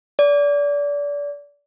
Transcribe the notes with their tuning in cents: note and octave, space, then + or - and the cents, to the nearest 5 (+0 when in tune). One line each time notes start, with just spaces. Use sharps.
D5 -30